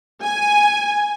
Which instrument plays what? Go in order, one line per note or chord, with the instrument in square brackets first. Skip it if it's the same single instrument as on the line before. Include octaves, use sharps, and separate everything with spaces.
[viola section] G#5